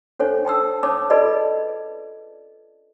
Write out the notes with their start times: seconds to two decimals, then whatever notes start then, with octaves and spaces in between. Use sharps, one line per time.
0.19 C#4 D4 A4 C5 C#5
0.45 G5 A5 D#6 E6
0.83 C#4 C#5 A5 D6 D#6
1.10 F4 G#4 A4 B4 D5 D#5